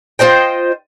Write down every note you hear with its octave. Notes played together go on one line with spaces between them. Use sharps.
F4 C5 D#5 G5